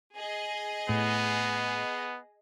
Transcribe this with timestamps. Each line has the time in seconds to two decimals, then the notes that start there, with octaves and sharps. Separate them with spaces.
0.16 G#4 D#5
0.89 A2 B3